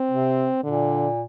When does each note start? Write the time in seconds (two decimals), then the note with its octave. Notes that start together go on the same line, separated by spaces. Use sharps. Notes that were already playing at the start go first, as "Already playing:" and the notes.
Already playing: C4
0.11 C3
0.64 A#2 D3